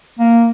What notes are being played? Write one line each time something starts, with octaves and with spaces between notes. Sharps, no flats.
A#3